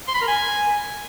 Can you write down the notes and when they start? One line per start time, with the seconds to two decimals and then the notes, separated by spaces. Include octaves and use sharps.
0.08 C6
0.15 B5
0.21 A#4
0.28 G#5